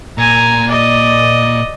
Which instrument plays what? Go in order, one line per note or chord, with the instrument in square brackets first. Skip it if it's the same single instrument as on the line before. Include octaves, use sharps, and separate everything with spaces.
[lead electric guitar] A#2 [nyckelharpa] G#5 A#5
[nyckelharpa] D5 D#5